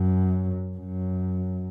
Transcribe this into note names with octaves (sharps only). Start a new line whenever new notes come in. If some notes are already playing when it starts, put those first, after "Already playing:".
Already playing: F#2
F#2